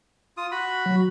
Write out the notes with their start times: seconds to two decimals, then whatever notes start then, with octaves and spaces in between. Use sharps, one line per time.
0.37 F4 D#6
0.52 F#4 B5
0.86 F#3